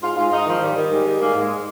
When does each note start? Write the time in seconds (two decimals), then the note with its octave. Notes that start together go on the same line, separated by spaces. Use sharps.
0.01 G#2 F4
0.17 G#2 F4
0.32 G#2 D#4
0.46 D#3 F3
0.61 D#3 G3
0.76 D#3
0.90 G#2 G3
1.06 D#3
1.19 G#2 A#3
1.34 G#2
1.39 G#3